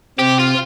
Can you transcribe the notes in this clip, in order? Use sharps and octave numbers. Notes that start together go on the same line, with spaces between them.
C3 C4 G4
F4